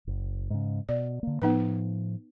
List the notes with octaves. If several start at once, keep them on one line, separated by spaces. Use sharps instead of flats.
F#1
G#2 C#3
B2 D5
D3 A#3
A2 F3 B3 D#4 B4